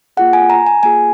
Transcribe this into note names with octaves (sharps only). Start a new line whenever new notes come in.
A#3 F4 G#4 F#5
G#5
A#5
G#5
A#3 F4 G#4 G#5